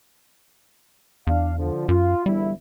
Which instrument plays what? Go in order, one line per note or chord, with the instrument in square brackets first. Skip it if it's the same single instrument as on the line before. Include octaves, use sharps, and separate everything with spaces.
[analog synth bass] E2 [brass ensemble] D4 F5
[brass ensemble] D3 F3
[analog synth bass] F#2 [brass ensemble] F4
[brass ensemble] G1 E2 E4 [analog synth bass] G3